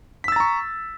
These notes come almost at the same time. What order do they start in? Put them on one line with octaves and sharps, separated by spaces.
B6 E6 A6 A#5 C#6